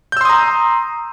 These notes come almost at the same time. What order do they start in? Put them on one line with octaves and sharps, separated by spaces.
G6 E6 C6 D#6 A#5